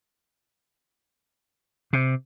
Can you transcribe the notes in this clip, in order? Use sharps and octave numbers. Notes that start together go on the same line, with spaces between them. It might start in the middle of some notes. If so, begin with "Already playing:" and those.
C3